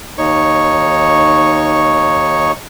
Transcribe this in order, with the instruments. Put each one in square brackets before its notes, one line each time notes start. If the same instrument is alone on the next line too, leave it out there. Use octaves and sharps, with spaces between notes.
[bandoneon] D#2 D#4 C#5 C#6